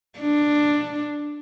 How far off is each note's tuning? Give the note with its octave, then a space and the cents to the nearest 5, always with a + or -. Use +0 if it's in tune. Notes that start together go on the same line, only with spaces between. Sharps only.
D4 +10